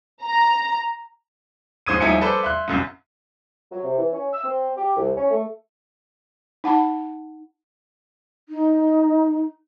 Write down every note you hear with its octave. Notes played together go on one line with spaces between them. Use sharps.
A#5
D1 G#2 C5 D#6 G#6 D#7
D#1 F3 D#4 E4 G#5 C#7
A4 B4 C5 D5
E5 C6 F#6
D#1 C2 F#2
F#3
C3
E3
C#4
E6
C4
G4
C2
C#4
A3
D#4 F#5 A5 B5
D#4